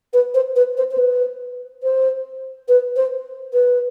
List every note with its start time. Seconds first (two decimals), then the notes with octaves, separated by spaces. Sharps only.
0.13 B4
0.34 C5
0.56 B4
0.77 C5
0.91 C5
0.98 B4
1.83 C5
2.68 B4
2.96 C5
3.53 B4